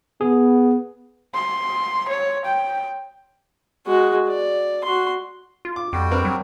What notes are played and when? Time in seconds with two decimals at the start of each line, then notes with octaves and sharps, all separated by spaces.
0.21 B3 G#4
1.34 C6
2.08 C#5
2.45 G5
3.87 G#3 F#4
4.28 D5
4.84 F#4 C6
5.65 F4
5.76 D6
5.93 F2 G3 F#4 G5
6.11 C4 A#4 B4
6.25 F#3